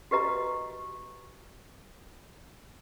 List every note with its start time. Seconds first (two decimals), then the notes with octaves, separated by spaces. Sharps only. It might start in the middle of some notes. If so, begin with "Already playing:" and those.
0.11 F#4 G4 B4 D#5 A#5